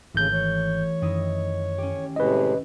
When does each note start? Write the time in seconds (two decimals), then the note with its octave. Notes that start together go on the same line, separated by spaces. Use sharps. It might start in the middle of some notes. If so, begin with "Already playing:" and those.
0.15 G#1 C#3 E3 A3 G6
0.33 C#5
1.02 F#2 D#3 D#4 E4
1.78 C#4 G4
2.16 A2 C3 G#3 E4 B4 D#5